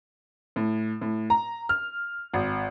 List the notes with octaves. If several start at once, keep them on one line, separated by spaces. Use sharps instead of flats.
A2
A2
A#5
F6
G#1